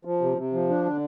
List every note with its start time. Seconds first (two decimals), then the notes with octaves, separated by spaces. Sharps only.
0.05 F3
0.21 C3
0.37 C3
0.53 F3
0.70 D4
0.85 D3